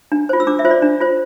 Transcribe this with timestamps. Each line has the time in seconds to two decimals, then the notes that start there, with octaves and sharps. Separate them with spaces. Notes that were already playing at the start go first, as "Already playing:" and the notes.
0.12 D4
0.29 F4 C5
0.40 E6
0.47 D4 D6
0.59 E5
0.65 F4 C5
0.71 D5
0.82 D4
1.00 F4 C5